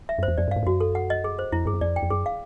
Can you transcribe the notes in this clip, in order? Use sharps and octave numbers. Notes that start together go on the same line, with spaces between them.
E5
F#2
C5
E2
F2 D5
G2
G#2 F5
G2
F#2 F#4
A4
F#5
D#5
G#4
C5
F2 E4
G2 G#4
F#2
F2 D5
G5
F2
F#2 G#4
F5